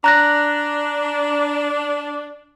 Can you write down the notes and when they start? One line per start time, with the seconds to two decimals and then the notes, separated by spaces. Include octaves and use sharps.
0.04 D4 A#5 F#6 A#6